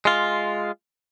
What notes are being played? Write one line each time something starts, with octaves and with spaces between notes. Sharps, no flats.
G#3 F4